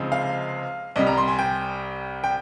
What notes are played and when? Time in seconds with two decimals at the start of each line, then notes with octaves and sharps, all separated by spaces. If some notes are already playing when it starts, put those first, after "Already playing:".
Already playing: C#2 C3 F3 G#3 D#4
0.12 F5
0.96 C2 C3 G3 D#5
1.07 A#5
1.18 C6
1.28 G#5
1.39 G5
2.24 G5